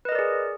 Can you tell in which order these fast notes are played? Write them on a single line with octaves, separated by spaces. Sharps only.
B4 D#5 A#4 D5 G#4